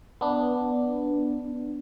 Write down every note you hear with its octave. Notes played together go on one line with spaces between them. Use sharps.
B3 D4